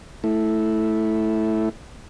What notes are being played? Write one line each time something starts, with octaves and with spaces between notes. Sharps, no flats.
A3 E4